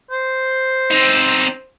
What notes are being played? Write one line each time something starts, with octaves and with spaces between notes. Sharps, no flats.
C5
C4 D#4